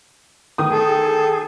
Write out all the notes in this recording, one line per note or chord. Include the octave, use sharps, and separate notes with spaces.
D#3 D#6
G#4 A4